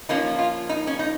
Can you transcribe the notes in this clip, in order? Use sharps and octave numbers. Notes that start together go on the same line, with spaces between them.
F3 A#3 C#4 D#4
F4
D#4
C#4
D#4